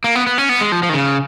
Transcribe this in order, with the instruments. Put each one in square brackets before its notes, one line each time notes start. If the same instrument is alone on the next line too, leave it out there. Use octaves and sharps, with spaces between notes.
[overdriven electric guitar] A#3
B3
B3
C#4
B3
G#3
F3
F3
D#3
C#3